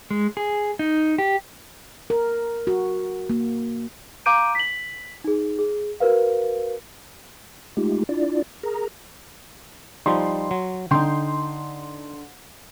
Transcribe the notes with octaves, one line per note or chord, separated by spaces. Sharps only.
G#3
G#4
D#4
G4
A#4
F#4
A#3
F5 A#5 D6 G6 D7 D#7
B6 F#7
D#4 G#4
G#4
F#4 A#4 B4 F5
G#3 A3 D#4 F4 G4
D4 E4 F4 D5
G#4 A#4 A#5
F3 G3 D#4 C6
F#3
D3 D#4 G5 C6